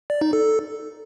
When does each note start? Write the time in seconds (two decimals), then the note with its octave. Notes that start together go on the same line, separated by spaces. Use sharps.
0.10 D5
0.21 D#4
0.33 A4